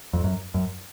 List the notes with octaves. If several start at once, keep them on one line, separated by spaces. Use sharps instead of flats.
F2
F#2
F#2